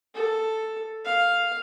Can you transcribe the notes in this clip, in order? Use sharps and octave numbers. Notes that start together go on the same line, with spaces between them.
A4
F5